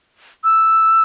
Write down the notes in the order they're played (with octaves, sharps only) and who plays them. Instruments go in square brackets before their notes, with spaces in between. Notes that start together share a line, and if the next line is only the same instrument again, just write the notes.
[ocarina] E6